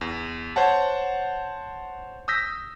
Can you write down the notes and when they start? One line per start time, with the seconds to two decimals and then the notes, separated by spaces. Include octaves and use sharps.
0.01 E2
0.56 C5 C#5 F#5 A5
2.28 D#6 E6 G6 A#6 B6